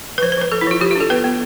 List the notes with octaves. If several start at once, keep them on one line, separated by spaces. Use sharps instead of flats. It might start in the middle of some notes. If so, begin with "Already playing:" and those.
B4
F3 C5
C5
F3 B4
F3 A4
E4
F3 F4
F3 G4
F4
D4 A4
B3 B4
B3